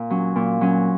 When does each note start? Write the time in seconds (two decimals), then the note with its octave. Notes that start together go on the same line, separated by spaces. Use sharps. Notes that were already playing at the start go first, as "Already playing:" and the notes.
Already playing: A#2
0.10 F#3 C#4
0.36 A#2
0.61 F#3 C#4